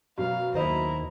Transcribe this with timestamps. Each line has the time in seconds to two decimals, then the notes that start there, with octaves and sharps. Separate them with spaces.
0.18 F#2 B2 F5
0.54 D#2 E4 C5 D#5 A#5